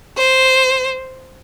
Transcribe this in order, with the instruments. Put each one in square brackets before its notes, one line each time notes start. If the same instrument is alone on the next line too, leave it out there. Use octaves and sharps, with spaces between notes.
[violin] C5